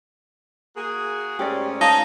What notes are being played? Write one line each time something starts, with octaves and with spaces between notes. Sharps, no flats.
A#3 F#4 G#4
G#2 A3 C#4 G4 D5
D#4 C#5 F5 A5